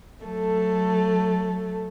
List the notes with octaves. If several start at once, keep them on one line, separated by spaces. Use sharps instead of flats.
F#3 A3 A4